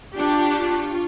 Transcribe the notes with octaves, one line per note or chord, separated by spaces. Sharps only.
D4 F4 G4 C#6